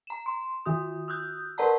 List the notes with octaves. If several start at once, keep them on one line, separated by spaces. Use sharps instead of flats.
A#5 E7
C6
D#3 F#4 D#6
D#6 E6 F#6 G6
A#4 B4 D5 F#5 A5 A#5